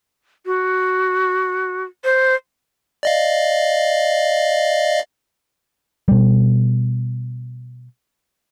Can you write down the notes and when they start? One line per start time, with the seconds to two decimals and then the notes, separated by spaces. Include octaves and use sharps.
0.46 F#4
2.04 C5
3.03 D5 D#5 F5
6.08 B2 G3